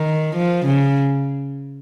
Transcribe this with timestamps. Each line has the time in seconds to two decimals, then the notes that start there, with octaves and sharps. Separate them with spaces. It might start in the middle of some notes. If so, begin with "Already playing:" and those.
Already playing: D#3
0.36 F3
0.66 C#3